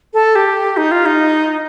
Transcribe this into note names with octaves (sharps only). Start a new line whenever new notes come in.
A4
G4
D#4
F4
D#4